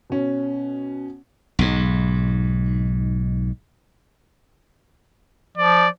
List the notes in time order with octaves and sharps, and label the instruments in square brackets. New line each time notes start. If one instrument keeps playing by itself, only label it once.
[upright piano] B2 C#4
[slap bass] B1 G#2
[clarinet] F3 [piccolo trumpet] D5